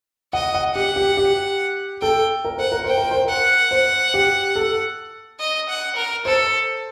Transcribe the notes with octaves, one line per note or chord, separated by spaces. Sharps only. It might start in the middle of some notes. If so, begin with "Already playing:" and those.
D#5 F#5
F#5
G4 F#5
G4
G4
A4 G5
A#4
C5 F#5
A#4
C5 G5
A#4
C5
A#4 F#5
C5
G4
A4
D#5
F#5
A#4
A4 C5